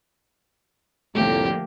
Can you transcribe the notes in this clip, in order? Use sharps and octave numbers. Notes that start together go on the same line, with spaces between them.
C2 F2 A2 D3 F3 A3 A#3 G4